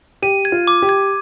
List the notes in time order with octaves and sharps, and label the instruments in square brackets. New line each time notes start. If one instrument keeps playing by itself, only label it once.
[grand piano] G4 [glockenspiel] D#7
[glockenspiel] G#6
[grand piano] F4
[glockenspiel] D6
[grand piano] G4
[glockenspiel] G#6